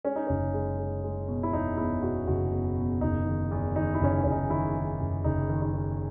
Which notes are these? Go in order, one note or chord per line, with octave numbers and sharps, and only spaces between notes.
G#3 C#4
D#4
F#1 C#4
G#3
G#3
G#3
B2
E4
E2 D#4
E2 E4
B2 F#4
F#1 F#4
E2
B2
F#1 D#4
D#3
E2
D#3 D#4
E4
F#1 C#4
D#4
F#1 C#4
D#4
D#3 E4
D#3
F#1
F#1 D#4
D#3
D#4
D#3